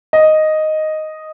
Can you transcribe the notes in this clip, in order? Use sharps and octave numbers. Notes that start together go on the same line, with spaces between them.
D#5